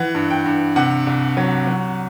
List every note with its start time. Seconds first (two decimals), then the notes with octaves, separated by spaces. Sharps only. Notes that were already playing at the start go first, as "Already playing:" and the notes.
Already playing: E3 F#5
0.15 G2
0.30 G5
0.46 G2
0.76 C3 F#5
1.07 C2
1.37 F#3
1.67 F#3